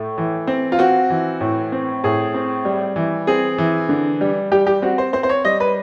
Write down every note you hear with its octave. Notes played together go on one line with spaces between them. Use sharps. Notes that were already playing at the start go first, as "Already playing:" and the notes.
Already playing: A2 A3
E3
C4
F4
C4 F#4
E3
A2
C4
A2 G#4
C4
G3
E3
C4 G#4
E3
D3
G3
G3 G4
G4
C4 F#4
C5
C4 C5
C5
C#5
G3 D#5
B4